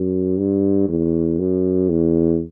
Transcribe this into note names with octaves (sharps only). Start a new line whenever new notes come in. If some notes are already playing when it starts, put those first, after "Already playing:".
Already playing: F#2
G2
E2
F#2
E2